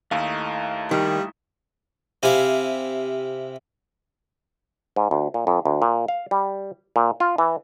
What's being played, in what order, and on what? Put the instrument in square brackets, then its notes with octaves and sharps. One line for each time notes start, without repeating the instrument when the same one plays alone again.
[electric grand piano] D#2 F5 [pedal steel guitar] A3 D#4 E4
[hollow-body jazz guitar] D#3 [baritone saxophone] G3
[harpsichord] C3 E4 F5 G#5
[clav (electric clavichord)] G#2
D2
A#2
F2
D2
A#2
F5
G3
A#2
F4
E3